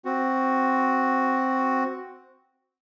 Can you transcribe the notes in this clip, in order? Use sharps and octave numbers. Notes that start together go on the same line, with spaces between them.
C4 F#4